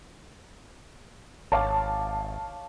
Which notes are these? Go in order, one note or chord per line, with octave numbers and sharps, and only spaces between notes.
G#1 C#5 F5 A5 D6